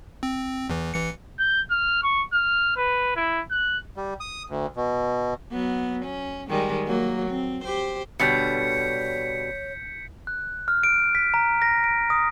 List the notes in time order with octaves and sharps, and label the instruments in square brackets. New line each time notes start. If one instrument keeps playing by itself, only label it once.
[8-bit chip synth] C4
E2 E3
A1 E3 C#7
[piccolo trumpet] G6
F6
C#6
F6
B4
E4
F#6
[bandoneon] G3
D#6
D2
B2
[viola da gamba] F#3 B3
C#4
D#3 G3 G#3
F#3 A#3
C4
G4 C5
[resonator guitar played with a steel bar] B2 D3 G3 [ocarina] C#5 [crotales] G6 B6 C#7
[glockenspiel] F#6
F6
D7
B6
A#5
A#6
D7
D#6